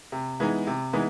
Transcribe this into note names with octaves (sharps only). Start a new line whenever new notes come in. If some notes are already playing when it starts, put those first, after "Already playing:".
C3
E3 G#3 B3 D#4
C3
E3 G#3 B3 D#4